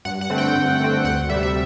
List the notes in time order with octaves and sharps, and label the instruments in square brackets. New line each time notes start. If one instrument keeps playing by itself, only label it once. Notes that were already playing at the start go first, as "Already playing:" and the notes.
[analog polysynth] G2 F#5
F#5
D3 A3 C4
G5
G2
D3 A3 C4
D2 F#5
C3 G3 E5
E5